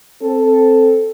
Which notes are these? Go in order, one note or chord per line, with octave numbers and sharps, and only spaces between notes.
C4 A4